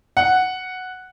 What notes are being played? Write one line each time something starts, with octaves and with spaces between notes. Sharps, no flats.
F#5